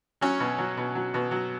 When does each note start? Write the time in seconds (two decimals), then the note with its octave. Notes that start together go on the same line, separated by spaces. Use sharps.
0.21 F#3 C#4
0.40 B2
0.58 F#3
0.77 B2
0.95 F#3
1.14 B2
1.31 F#3